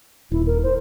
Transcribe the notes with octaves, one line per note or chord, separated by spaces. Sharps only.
D#1 E4
A#4
C5